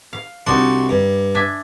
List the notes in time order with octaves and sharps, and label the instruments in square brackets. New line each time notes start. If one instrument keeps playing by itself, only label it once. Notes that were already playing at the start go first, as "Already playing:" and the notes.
[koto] F5
[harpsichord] C2 F#4 C6 [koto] D4 D#4
[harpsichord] G2
[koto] D4 E5 G#5